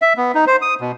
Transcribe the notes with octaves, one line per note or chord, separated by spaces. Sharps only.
E5
B3
D#4
C5
D#6
B2